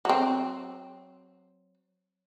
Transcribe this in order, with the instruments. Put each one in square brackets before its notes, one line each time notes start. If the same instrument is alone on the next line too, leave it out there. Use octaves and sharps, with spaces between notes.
[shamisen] F#3 C4